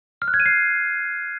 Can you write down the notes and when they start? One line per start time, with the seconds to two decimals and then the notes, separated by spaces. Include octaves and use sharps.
0.22 F6
0.28 F#6
0.34 G#6
0.40 D#7
0.46 C7